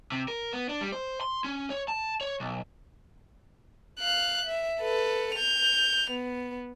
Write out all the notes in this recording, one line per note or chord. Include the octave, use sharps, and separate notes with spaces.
C3
A#4
B3
D4
G3
C5
C6
C#4
C#5
A5
C#5
B1
F5 F#6
E5
A4 B4
G6 F7
B3